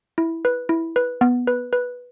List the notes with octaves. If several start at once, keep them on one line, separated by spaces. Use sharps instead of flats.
E4
B4
E4
B4
B3
B4
B4